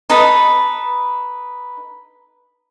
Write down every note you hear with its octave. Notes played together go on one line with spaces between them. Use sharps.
D#4 A4 B4 B5